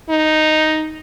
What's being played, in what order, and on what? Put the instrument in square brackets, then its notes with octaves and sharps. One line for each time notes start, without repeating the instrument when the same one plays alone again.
[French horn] D#4